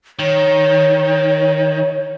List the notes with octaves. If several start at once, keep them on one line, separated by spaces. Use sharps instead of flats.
D#3 C#5